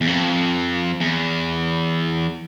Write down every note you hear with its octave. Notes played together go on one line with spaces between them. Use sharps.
E2
F2
E2